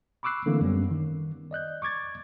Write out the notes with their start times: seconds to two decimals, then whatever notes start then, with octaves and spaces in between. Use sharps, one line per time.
0.23 B5 C#6 D6 E6 F#6 C7
0.46 D3 E3 A3 A#3 C4
0.61 F#2 G3 B3 C#4
0.91 D#3
1.51 D5 D#5 F#6 G6
1.82 C#6 D6 G#6 A6